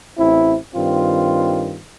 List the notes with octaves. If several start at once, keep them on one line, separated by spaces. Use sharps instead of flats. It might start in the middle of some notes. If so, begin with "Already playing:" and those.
A1 C4 E4
G2 D#3 C4 F4